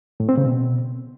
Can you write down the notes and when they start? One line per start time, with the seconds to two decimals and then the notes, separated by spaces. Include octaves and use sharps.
0.20 A2
0.29 C4
0.37 C#3
0.46 B2